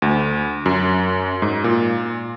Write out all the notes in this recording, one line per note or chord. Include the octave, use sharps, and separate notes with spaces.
D2
F#2
G#2
A#2